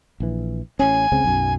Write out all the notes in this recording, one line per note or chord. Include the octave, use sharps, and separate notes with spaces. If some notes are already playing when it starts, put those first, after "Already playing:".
A#1 E3
A1 C#4 G#5
C#2 C#3 C4
B1 F#2